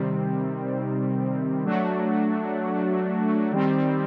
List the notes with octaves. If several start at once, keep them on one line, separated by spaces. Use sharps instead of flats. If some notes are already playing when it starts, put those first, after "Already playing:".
Already playing: C3 D#3 G3 C4
F#3 A3 D4 F#4
D#3 G3 C4